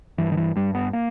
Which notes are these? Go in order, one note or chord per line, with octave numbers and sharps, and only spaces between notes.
G2 E3
D#3
E3
G2 G3
B3
A#3